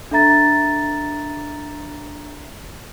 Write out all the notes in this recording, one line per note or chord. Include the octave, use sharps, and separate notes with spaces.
D4 A4 E5 A#5 A6